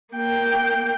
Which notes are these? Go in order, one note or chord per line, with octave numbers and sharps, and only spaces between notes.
A#3 G5